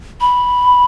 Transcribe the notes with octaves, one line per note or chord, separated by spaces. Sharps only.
B5